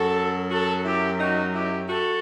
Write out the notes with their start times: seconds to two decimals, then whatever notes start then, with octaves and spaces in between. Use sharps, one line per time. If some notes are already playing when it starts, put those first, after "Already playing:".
Already playing: F#2 F#3 F#4 A4
0.51 F#4 A4
0.84 E4 G4
1.19 D#4 F#4
1.54 E4 G4
1.88 F#4 A4